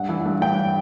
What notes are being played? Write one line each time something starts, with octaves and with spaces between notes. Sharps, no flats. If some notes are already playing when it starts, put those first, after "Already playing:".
Already playing: G2 F#5
E3
G2
G2 G5